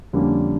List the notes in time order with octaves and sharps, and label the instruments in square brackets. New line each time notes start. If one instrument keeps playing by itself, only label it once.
[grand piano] F2 D3 G3 A#3 C#4